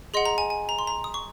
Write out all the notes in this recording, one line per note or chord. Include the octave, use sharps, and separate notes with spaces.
G#4 D#5 F#5 C6
A#5
G#5
G#5
A#5
C6
A#5
D#6
C#6